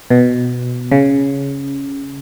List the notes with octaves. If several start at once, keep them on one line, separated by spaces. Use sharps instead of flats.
B2
C#3